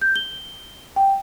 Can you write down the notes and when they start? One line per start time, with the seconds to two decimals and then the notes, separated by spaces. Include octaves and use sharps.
0.02 G6
0.16 G7
0.96 G5